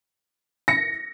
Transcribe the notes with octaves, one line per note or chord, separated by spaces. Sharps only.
A#6 C#7